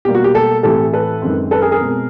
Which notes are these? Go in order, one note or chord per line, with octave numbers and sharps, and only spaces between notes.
B2 G3 A#3 G4
F#4
G4
G4 A4
A2 E3 A3 C4 G4 A4
A4 B4
F#2 D#3 G#3 C4
A4 B4
G#4 A#4
G#4 A#4
B2 G#3 C4